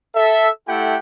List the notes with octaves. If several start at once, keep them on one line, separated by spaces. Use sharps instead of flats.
A4 E5
A3 E4 G4 A4 F#5 G5